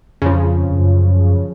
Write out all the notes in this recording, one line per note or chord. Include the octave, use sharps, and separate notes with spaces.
F2 C#3 F3
F#2